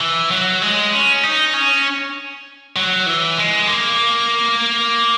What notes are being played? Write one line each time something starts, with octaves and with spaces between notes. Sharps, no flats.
E3
F#3
G#3
C#4
D#4
C#4
F#3
E3
G#3
A#3